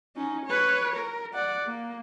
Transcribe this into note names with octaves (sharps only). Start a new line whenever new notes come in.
C#4 D#4
B4 C#5
A#4
D5 F#5
A#3